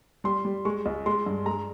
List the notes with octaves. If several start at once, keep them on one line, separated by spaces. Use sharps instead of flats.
G3 C6
G3
G#3 C#6
C#2
G#3 C6
G2
G#3 A#5